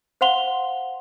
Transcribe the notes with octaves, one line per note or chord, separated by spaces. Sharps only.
C5 F5 F#5 C6 F7 G7